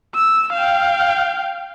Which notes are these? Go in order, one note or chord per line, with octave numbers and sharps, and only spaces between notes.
E6
F5 G5